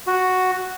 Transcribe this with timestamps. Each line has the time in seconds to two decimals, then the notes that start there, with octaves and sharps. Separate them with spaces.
0.07 F#4